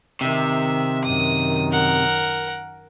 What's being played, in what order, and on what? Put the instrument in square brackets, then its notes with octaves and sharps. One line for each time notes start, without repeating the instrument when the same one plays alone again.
[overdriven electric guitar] C3 [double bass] D#3 [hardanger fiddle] E5
[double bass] F#2 D#3 [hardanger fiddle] D#6
[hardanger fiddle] A#4 F#5